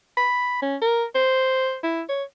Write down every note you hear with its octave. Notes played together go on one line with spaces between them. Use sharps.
B5
C#4
A#4
C5
E4
C#5